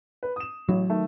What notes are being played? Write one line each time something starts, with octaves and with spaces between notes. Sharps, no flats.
B4
D#6 E7
A1 F#3
D#3 A3